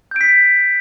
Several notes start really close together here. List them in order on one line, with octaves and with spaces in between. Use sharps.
G6 D7 B6